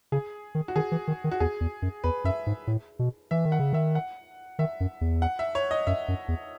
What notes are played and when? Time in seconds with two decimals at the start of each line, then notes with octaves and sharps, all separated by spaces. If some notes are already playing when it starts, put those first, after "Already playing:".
0.12 C#3 G#4
0.55 D#3
0.68 F#4
0.76 D#3 G#4
0.92 E3
1.08 D#3
1.24 D#3
1.31 F#4
1.40 E2 G#4
1.61 E2
1.82 F#2
2.04 E2 B4
2.24 F#2 E5
2.47 G#2
2.67 A2
2.99 B2
3.31 E3 E5
3.45 D#3
3.52 F#5
3.59 C#3
3.73 D#3 E5
3.95 F#5
4.59 D#3 E5
4.80 F#2
5.01 E2
5.22 F#5
5.39 E5
5.55 C#5
5.71 D#5
5.87 F#2 E5
6.08 F#2
6.28 E2